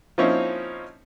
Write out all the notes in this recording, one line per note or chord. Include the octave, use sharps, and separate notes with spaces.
F3 A#3 C4 C#4 D#4 E4